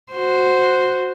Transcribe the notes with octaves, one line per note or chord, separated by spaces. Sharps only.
F#4 C5